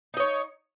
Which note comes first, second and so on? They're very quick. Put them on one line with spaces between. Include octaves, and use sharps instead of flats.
D#4 D#5 C#5